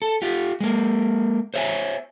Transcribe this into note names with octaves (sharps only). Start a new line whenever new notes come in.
A4
F4 G4
G#3 A#3
C5 C#5 E5 G5 G#5